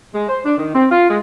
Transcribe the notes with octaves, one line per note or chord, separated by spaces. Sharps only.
G#3
C5
D4
D#3
C4
F4
G#3